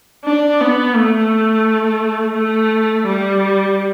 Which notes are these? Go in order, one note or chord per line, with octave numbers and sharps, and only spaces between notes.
D4
B3
A3
A3
G3